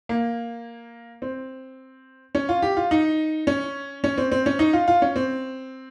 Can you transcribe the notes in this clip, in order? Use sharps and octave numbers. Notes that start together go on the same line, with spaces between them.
A#3
C4
C#4
F4
G4
F4
D#4
C#4
C#4
C4
C4
C#4
D#4
F4
F4
C#4
C4